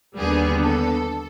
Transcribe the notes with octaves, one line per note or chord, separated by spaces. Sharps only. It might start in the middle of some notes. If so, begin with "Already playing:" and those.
D#2 D3 G3 B3 G#4
A4